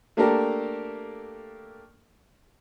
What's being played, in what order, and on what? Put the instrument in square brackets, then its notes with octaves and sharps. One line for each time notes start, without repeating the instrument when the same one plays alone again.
[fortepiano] A3 A#3 D4 G4 A4 A#4